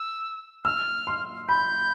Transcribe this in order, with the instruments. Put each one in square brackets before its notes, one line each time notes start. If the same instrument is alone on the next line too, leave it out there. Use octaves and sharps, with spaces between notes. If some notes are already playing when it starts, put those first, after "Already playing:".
Already playing: [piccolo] E6
[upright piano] E6 [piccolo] F6
[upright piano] C6
[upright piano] B5 [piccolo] G6